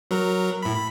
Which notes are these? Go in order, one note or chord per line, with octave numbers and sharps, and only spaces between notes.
F#3 A#4
A2 B5
B5